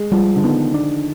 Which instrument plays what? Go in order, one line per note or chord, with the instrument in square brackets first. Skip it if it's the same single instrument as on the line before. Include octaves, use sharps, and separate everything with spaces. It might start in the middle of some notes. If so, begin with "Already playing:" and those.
Already playing: [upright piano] G#3
[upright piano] F3 [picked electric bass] G3
[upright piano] D3
[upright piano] D#3 [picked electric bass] B3
[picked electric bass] D4